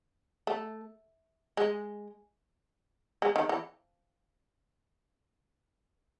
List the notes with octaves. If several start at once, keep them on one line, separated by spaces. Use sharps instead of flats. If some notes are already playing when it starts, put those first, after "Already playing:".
A3
G#3
G#3
D#3
E3